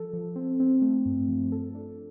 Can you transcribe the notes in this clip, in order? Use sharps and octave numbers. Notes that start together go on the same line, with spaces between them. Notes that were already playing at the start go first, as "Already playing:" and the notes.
Already playing: F3 A4
F3
C4
C4
A3
G2
F3
A4
D4